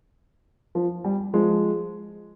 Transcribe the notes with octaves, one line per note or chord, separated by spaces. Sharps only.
F3
G3
F3 G#3